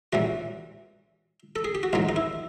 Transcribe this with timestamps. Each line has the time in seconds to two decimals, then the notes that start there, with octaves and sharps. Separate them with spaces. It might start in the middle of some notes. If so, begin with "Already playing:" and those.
0.13 A#1 A2 E3 G3 F#4
1.56 A4
1.65 G#4
1.75 G4
1.83 F#4
1.93 A1 G#2 D#3 F#3 F4
2.09 D#4
2.16 E4